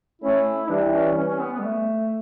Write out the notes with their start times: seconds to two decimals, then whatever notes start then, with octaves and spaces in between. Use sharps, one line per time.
0.22 A3 C#4 E4
0.69 E3 G3 D4
0.92 C#4
1.17 C#4
1.28 C#4
1.41 B3
1.53 B3
1.59 G3
1.64 A3